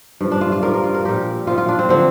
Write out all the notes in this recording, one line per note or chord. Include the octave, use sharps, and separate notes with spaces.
G2 F3
D4
F4
F4
G2 F3 A#4
A#4
F4
A#4
A#2 F3 G4
A#2 F3 F4
F4
D4
C4
D3 F3 C4